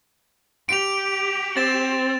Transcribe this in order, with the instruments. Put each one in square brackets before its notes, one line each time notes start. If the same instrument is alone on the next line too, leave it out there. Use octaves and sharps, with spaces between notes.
[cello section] G4 [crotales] D7 F7
[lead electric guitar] C4 [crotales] A6 E7